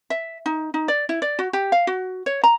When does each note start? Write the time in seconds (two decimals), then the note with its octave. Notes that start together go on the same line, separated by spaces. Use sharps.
0.10 E5
0.46 D#4
0.74 D#4
0.88 D5
1.09 E4
1.22 D5
1.39 F#4
1.53 G4
1.72 F5
1.87 F#4
2.26 C#5
2.44 A#5